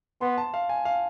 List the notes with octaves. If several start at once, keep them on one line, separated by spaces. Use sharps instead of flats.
B3 C6
A5
F5
G#5
F5